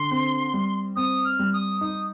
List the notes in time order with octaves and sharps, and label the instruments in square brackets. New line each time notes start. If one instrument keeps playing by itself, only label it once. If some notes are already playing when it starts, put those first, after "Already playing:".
Already playing: [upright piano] D3 [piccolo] C6
[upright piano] C4
G3
[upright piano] C4 [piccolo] D#6
[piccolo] F6
[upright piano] G3
[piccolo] D#6
[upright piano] D#4 [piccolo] D#6